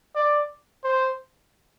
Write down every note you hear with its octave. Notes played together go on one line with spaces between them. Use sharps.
D5
C5